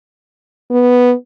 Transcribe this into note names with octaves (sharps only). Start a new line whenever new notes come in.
B3